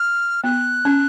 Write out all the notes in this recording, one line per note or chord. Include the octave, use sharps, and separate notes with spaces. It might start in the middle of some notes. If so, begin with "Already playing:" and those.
Already playing: F6
B3 F#6
C#4